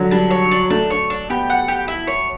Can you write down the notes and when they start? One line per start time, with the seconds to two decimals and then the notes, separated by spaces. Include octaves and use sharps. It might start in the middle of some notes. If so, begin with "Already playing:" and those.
Already playing: D3 F#3
0.11 G3 D4
0.31 C#5
0.51 D4
0.70 A3 D4
0.90 C#5
1.10 D4
1.30 B3 G4
1.50 F#5
1.68 G4
1.88 E4
2.07 C#5